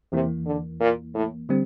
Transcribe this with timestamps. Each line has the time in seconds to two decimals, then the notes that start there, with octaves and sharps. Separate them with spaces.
0.12 E2 C3 E3 A#3
0.46 D3
0.80 A#2
1.14 A2
1.49 D3 G3 C4